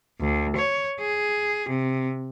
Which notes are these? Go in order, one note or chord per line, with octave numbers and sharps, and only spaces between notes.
D2
C#5
G#4
C3